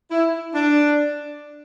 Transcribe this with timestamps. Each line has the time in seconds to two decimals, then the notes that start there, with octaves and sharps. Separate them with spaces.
0.11 E4
0.54 D4